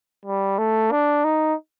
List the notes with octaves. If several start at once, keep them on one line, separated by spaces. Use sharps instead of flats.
G3
A3
D4
D#4